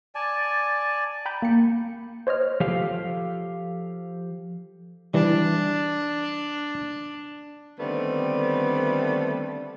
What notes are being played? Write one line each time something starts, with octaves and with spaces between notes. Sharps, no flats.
D5 G#5 A5
G5 A#5 B5 G6 A6
A#3 C#7
C5 C#5 D#5 F6
F3 G4 A4 F5
E3 G3 D4
D3 D#3 G3 A3 B3 C4